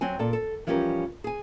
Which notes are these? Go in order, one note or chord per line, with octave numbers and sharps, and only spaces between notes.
F#3 C4 G#5
A#2 A4 D5
A4
E3 F3 G3 C#4 G4 A#4
G#4 G#5